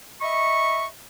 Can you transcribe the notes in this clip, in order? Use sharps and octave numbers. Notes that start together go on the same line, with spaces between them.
D#5 E5 B5 C#6